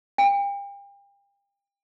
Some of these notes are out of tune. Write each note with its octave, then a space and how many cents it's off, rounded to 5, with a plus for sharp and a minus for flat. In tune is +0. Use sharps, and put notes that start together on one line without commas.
G5 +35